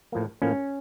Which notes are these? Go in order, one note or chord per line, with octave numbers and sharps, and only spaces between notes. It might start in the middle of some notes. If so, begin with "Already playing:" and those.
A2 F3 A#3
A2 F3 A#3 C#4